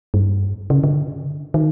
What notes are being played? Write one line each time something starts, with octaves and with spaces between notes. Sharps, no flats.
G2
C#3
D3
D#3